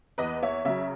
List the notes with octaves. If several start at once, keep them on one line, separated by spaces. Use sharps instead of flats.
E2 B4 D#5
C#5 E5
C#3 F#3 C#5 E5